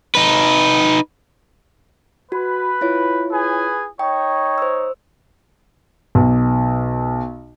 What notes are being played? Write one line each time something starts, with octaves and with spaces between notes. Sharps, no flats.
D#4 B4
F#4 B4
E4 F4 C#5
G#4 B4 G#5
D#4 C#5 G5
C5 E6
B1